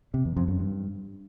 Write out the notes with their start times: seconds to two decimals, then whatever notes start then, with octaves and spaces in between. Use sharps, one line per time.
0.14 C3
0.25 E2
0.36 F2
0.48 F#2
0.59 G2